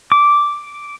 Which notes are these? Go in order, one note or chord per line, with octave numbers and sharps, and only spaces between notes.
D6